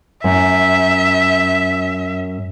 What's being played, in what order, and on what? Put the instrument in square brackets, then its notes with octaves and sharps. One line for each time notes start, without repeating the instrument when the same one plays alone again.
[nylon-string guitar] F#2 [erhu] E5